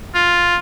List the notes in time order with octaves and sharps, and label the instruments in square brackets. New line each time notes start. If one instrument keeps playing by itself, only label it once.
[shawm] F4